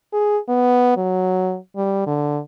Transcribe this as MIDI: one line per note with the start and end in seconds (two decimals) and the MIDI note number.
0.13 0.38 68
0.49 0.96 59
0.97 1.57 54
1.76 2.02 55
2.06 2.40 50